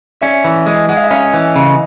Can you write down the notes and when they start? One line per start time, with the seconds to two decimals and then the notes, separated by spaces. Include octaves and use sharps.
0.22 C#4 D5 E5
0.44 E3
0.66 G#3
0.89 G#3 F#5
0.97 F5
1.04 E5
1.11 C#4 D#5 F5
1.34 E3
1.56 C#3